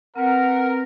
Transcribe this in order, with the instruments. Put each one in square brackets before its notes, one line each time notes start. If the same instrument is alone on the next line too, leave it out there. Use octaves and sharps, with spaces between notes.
[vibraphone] C4 B4 [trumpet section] A#4 [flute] F#5